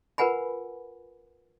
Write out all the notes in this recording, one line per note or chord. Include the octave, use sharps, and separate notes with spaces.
F4 A#4 B4 F#5 G#5 B5